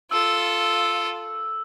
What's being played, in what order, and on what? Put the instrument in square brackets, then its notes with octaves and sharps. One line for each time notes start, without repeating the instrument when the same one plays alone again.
[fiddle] F4 A4 [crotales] E6